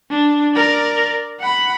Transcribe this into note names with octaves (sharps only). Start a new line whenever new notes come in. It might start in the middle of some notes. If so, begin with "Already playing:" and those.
D4
A#4 D5
F#5 B5